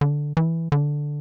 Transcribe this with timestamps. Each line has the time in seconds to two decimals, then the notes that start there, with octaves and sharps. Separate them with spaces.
0.01 D3
0.37 E3
0.72 D3